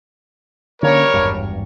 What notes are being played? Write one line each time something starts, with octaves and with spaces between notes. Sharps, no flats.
D3 G3 A#3 C#4 A#4 C#5
G#1 E2 G2